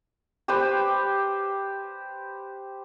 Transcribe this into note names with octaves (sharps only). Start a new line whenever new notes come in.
G4 B4 C5 G5